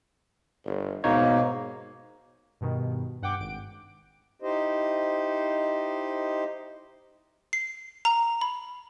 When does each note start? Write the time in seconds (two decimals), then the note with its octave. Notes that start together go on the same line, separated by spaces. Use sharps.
0.66 G1
1.04 G#2 B2 A#3 D#4 C#5
2.61 G2 B2 D#3
3.22 G2 F#5 G5 D6
3.39 G#1 D7
4.42 D#4 E4 G4 C5 D#5
7.53 C7
8.05 A#5
8.41 B5